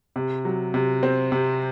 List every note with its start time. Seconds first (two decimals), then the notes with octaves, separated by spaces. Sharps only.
0.16 C3
0.45 F#3
0.74 C3
1.03 C4
1.32 C3